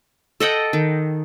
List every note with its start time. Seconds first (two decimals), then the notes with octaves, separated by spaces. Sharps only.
0.40 A4 D#5 F#5 G5
0.73 D#3